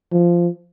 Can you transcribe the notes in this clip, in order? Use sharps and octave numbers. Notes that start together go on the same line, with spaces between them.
F3